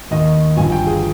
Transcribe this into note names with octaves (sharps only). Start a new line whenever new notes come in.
D#2 D#3 D#5
G1 G2 F3 G#5
G5
G#4